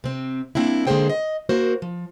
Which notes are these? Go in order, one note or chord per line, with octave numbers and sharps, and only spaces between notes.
C3 C4
A#3 C4 D4 E4
D3 G#3 A#3 G#4 C5 G5
D#5
A#3 F#4 A#4 C5
F3